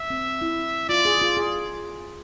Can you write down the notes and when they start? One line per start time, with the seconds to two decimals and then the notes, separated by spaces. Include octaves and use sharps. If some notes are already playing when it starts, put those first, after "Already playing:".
Already playing: E5
0.10 C4
0.42 E4
0.89 F4 D5
1.05 G#4
1.22 F4
1.37 G#4